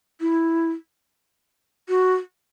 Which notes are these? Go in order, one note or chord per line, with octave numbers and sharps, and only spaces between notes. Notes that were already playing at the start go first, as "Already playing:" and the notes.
E4
F#4